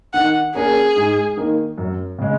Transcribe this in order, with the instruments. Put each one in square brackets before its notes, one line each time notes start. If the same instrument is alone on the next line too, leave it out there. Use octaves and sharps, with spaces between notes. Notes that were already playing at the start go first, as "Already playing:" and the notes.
[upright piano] D#3 [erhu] F#5
[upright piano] A#3 C#4 A#4 [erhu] G#4
[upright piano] G#2
D#3 A#3
F#2
C#3 G#3